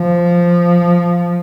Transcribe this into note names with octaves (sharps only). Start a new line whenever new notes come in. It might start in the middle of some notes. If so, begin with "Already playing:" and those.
Already playing: F3